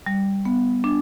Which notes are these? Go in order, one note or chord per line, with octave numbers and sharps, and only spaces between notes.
G3
B3
D4